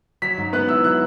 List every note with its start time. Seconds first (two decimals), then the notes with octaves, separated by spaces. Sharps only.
0.22 F#3 B6
0.38 G#2
0.53 B3 F#6
0.69 E4 E6
0.84 F#3 F#6